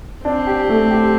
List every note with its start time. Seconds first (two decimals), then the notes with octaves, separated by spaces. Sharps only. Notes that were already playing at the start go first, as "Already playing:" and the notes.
0.25 C4 D4
0.47 G4
0.69 A3
0.91 G4